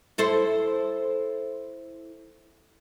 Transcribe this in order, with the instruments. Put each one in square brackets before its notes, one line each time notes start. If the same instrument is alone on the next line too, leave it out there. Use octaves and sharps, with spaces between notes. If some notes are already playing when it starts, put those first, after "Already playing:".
[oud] E4 A4 C5